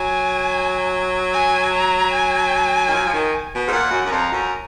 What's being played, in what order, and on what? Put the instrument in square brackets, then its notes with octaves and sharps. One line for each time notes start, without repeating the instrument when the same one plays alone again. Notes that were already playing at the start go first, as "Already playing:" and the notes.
Already playing: [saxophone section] F#3 [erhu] G#5
[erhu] G#5
A#5
G#5
[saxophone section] D#3
F3
F3
D#3
B2
G#2
[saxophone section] A#2 [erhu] F#5
[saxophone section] F#2
F#2
[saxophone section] F2 [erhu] A#5
[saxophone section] F#2